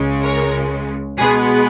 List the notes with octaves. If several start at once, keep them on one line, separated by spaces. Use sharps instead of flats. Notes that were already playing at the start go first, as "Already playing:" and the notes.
Already playing: C#2 C#3 G#3
A#4 C#5
B2 G#3 B3 G#4 B4